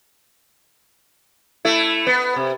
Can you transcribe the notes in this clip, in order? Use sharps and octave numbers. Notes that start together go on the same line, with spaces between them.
A3 E4
B3
C3